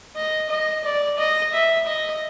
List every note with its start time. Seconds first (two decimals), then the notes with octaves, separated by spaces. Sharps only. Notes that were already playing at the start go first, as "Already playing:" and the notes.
0.16 D#5
0.50 D#5
0.84 D5
1.18 D#5
1.53 E5
1.87 D#5